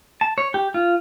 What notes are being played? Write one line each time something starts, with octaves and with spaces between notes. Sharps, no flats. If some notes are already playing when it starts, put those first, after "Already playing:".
A5
C#5
G4
F4